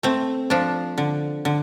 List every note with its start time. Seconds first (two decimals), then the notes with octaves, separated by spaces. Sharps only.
0.03 A3 C4
0.50 F3 D4
0.98 D3
1.45 D3